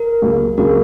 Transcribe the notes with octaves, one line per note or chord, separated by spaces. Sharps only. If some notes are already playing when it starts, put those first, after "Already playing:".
Already playing: A#4
C#2 C#3 F#3 A#3
C#2 C#3 F#3 A#3 A#4